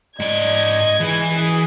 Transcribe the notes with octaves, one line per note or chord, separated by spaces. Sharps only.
G#2 D5 D#5 G#6
E3 G#3 B4
F#2 G#4